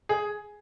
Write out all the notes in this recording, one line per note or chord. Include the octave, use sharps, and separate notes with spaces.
G#4